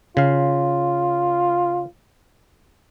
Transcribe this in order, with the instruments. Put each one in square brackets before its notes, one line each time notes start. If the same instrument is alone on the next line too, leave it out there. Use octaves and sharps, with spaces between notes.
[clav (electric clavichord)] C#3 F5 [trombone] F4